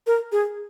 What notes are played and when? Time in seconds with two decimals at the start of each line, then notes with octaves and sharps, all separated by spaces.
0.07 A#4
0.32 G#4